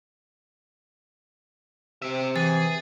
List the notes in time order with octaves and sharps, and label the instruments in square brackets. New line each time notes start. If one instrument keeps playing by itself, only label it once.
[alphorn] C3 [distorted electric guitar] C4 E5
[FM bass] E3 [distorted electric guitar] G#4 [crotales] A6